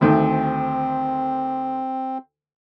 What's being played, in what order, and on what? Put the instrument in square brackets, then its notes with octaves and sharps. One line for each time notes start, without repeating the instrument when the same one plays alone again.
[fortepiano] D2 D#3 A3 [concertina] C4